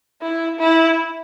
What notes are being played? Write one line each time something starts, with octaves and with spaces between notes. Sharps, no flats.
E4
E4